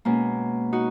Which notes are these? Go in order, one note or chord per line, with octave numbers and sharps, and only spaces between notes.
B2 G#3 A#3 C#4
D#4 F#4